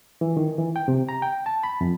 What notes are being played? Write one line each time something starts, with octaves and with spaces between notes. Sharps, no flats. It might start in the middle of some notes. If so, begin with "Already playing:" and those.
E3
D#3
E3
G5
C3
A#5
G5
A5
B5
F2